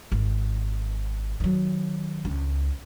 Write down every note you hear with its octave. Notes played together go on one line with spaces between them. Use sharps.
G#1
D#3 F#3
C#2